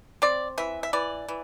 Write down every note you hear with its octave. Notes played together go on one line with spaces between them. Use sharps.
C4 D5
E3 E5
E5
E3 D5
E3